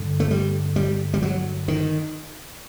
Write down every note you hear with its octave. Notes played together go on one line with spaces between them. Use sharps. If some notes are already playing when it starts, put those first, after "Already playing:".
Already playing: G2 D3
A3
G3
G3
G3
F#3
D#3